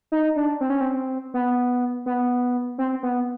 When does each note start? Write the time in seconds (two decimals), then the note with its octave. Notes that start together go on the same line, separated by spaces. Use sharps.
0.12 D#4
0.36 D4
0.61 C4
0.70 C#4
0.81 C4
1.34 B3
2.06 B3
2.78 C4
3.03 B3